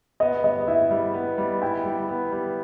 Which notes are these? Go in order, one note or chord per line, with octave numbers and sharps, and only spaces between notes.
B3 D#5
G3 D#5
E4 E5
G3
B3
G3
E4 G5
G3
B3
G3